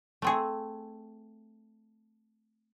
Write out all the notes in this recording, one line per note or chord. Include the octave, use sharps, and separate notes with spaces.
A3 C4 G#4